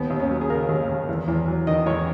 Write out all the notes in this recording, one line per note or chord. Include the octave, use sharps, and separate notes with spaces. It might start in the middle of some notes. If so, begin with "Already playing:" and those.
Already playing: D#2 B3
D#2
C#4
F#3
G#4
C#3 A#4
D#2
D#2
E2
E2
F#3
D#3 D#5
E2 C#5